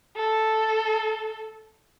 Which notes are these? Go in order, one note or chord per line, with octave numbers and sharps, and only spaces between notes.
A4